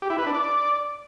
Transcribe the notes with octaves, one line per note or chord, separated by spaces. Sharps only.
G4
E4
B4
D4
D5